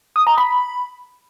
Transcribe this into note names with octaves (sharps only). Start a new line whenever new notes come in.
D#6
A#5
B5